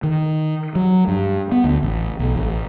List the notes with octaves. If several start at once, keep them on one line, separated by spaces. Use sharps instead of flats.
D#3
F#3
G2
B3
D2
A1
B1
A1